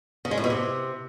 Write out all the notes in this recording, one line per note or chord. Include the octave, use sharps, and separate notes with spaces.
C#3
G#3
A2
B2
C3